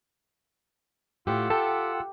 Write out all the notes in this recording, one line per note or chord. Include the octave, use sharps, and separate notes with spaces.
A2 F4 G4 F#5 E6
G4 A4